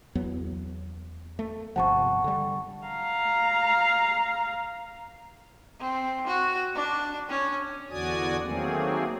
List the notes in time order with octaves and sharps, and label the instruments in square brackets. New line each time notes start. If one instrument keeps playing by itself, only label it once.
[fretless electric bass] E2 F#3 B3
A3
[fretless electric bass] G1 C3 F3 [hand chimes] F#5 A5 C#6
[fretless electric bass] D3 G3
[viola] F5 A#5
[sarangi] C4
F#4
D4
C#4
[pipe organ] E2 D3 F#4 D5 G#5 D#6
D#3 F#3 A3 A#3 C4 G#4